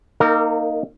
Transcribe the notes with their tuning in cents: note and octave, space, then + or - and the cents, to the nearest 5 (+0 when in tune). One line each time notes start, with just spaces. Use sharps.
A#3 +0 D#4 +0 A#4 -35